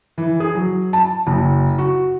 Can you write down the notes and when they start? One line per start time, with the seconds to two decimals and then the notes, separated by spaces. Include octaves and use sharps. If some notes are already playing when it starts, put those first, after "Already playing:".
0.18 E3
0.40 G#4
0.55 F#3
0.93 A5
1.27 F#1
1.78 F#4